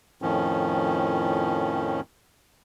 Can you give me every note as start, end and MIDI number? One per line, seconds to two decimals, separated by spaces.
0.22 2.01 41
0.22 2.01 45
0.22 2.01 51
0.22 2.01 53
0.22 2.01 61